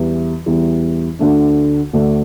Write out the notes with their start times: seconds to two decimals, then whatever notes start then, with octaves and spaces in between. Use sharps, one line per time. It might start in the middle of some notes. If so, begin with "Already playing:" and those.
Already playing: E2 E3 G3
0.46 E2 E3 G3
1.19 D2 D3 A3 D4
1.93 D2 D3 A3 D4